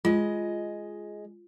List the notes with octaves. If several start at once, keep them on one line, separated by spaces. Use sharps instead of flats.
G#3 F4 D#5